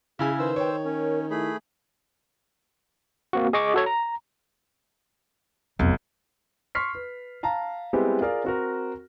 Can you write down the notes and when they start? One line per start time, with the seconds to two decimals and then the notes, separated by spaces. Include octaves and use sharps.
0.19 C#3 E4 G#4 G#5
0.39 D#3 B4 C5 E6
0.56 C#5 G5
0.85 C#4 A#4
1.31 A3 E4 G#4 B5
3.33 A#3 C4 F#4
3.53 G#4 D#5 C#6 D6
3.74 F#4 A4 C#5
3.86 A#5
5.79 F1 B1 E2
6.75 C6 C#6 F6 B6 C7
6.95 B4
7.43 F5 A5 A#5
7.93 G3 G#3 B3 C4 E4 G4
8.21 F4 G#4 A#4 D5 F5
8.44 C4 F#4 A#4